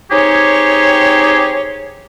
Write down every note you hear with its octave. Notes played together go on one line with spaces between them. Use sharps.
C4 D#4 G4 G#4 C#5